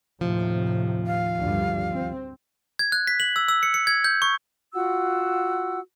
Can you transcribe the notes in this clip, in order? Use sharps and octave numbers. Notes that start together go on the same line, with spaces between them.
D#2 A2 C3 F3
F5
D2 G2 G3
C4
G#6
F#6
B6
F#7
E6
E6
C#7
C#7
G#6
G6
C#6
F4 F#4 F#5 E6